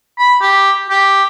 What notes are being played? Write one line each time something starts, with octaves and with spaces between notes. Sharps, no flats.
B5
G4
G4